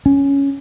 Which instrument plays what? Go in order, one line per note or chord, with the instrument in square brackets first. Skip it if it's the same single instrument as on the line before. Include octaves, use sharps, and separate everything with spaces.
[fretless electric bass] C#4